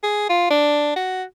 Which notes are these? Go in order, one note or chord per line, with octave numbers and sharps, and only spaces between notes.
G#4
F4
D4
F#4